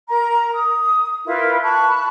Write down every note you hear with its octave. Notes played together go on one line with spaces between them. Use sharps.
A#4 A#5
D#6
E4 F4 A#4 B4
A5 B5 C#6 F#6